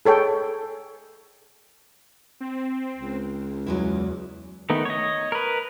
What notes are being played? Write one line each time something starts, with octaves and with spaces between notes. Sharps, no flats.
G#4 A4 C#5 G5
C4
C#2
E2 F#3 G#3 E4
D#3 A3 B3 D#4
C#5 D#5
A#4 B4